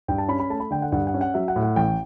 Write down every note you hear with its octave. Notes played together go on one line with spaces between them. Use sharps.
G2 G5
A5
C#4 B5
B5
A3 A5
B5
D3 G5
F#5
G2 F#5
F#5
C#4
F#5
F#3 E5
F#5
A2
F#5
A1 G5